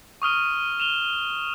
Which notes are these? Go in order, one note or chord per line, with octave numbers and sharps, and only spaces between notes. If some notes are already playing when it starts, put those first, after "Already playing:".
C#6 D#6 F6 D#7
E7 F7 G7